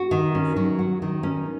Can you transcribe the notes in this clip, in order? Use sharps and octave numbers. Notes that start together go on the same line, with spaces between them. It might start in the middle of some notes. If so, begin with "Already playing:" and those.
Already playing: F#4
D#3
C#4
F#3
F#4
D#3
C#4